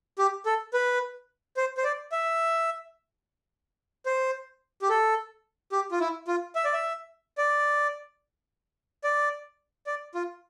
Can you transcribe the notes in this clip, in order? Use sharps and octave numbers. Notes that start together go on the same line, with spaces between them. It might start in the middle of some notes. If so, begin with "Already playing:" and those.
G4
A4
B4
C5
C5
D5
E5
C5
G4
A4
G4
F4
E4
F4
E5
D5
E5
D5
D5
D5
F4